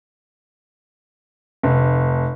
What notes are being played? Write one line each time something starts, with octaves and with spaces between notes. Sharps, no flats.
F1